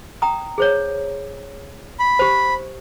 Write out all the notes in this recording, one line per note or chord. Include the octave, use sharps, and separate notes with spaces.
G5 A#5 D#6
G#4 C5 C#5
B5
G4 C5